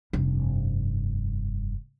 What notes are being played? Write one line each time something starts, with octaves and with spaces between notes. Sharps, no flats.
F1 G2